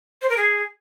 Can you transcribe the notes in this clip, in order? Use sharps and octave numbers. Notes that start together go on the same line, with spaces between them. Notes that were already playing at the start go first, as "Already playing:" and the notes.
C5
A#4
G#4